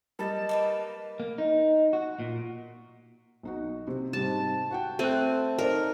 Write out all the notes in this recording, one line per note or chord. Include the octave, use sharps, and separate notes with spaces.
G3 A#4 D#5 A5
A#3 D#4 B4
A#3
D#4
F#4
A#2
B1 D#4 F#4
C3
G#2 C3 G3 A5
F#4 F#5 G5
A3 C4 F#6 D#7
D#4 A#4 C5 D5